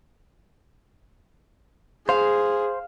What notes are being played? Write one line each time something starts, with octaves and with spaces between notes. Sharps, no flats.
G#4 C5 F5